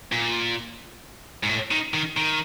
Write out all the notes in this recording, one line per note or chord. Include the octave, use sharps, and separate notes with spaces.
A#2
G#2
A2
D#3
D#3
D#3